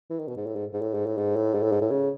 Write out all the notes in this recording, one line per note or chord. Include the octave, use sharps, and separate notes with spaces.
E3
D#3
B2
G#2
A2
G#2
G#2
A2
G#2
A2
G#2
A2
G#2
A2
G#2
A2
C#3